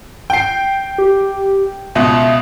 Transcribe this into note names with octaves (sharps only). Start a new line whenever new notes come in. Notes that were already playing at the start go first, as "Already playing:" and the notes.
G5 C7
G4
C#2 B2 E5 D#6